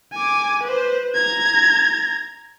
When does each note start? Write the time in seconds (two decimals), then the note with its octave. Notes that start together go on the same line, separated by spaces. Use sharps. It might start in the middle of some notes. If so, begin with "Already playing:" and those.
0.13 G#5 D6
0.64 B4 C5
1.15 A#5 G#6